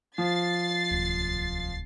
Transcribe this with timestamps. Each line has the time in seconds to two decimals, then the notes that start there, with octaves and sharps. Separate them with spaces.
0.18 F3 A6 C7
0.91 D1 C2